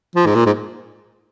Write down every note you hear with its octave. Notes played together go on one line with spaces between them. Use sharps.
F3
G#2
A#2
G#2